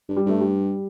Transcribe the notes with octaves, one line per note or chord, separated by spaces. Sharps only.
G2
G3
G2 A3
G3